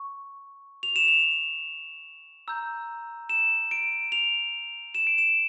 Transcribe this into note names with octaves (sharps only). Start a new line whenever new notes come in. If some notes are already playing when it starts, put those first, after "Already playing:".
Already playing: C#6
F7
E7
F7
A#5 E6 G6
E7
D7
F7
E7
D7
E7